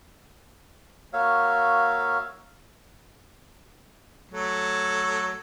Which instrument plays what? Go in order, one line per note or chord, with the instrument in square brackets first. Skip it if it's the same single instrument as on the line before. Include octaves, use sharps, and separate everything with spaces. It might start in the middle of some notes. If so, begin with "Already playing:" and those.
[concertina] A#3 F#4 C#5 E5 F5
[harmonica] F#3 A3